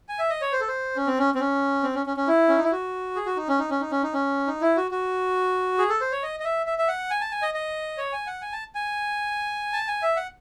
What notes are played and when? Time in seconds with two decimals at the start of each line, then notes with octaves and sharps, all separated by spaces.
0.09 G#5
0.19 E5
0.30 D#5
0.41 C#5
0.52 C5
0.60 A4
0.68 C5
0.96 C#4
1.07 C4
1.19 C#4
1.35 C4
1.40 C#4
1.83 C4
1.95 C#4
2.06 C#4
2.17 C#4
2.27 E4
2.49 C#4
2.56 D#4
2.64 E4
2.72 F#4
3.16 G#4
3.26 F#4
3.37 D#4
3.49 C#4
3.59 D#4
3.70 C#4
3.81 D#4
3.91 C#4
4.03 D#4
4.14 C#4
4.47 D#4
4.61 E4
4.77 F#4
4.91 F#4
5.78 G#4
5.89 A4
6.01 C5
6.12 C#5
6.23 D#5
6.40 D#5
6.44 E5
6.66 E5
6.78 E5
6.88 F#5
7.10 G#5
7.21 A5
7.32 G#5
7.42 D#5
7.54 D#5
7.98 C#5
8.12 G#5
8.27 F#5
8.42 G#5
8.52 A5
8.75 G#5
9.73 A5
9.88 G#5
10.02 E5
10.16 F#5